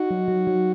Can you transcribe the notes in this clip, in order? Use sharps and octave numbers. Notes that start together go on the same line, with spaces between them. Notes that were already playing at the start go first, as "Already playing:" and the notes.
Already playing: D#4 F#4
F#3
F#3
F#3